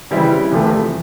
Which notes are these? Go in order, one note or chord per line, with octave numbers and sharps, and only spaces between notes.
C#3 E3 G3 C4 E4
E2 C3 F3 A3